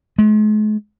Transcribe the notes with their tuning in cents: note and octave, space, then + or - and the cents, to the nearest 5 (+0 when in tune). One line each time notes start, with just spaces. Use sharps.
G#3 +45